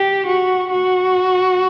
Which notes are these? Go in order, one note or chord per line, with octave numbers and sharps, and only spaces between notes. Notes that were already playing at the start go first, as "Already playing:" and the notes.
Already playing: G4
F#4
F#4